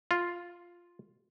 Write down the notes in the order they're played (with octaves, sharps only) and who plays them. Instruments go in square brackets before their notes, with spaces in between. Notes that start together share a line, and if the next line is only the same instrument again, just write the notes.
[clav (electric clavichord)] F4